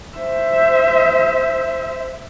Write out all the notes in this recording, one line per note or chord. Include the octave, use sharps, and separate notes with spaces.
C5 E5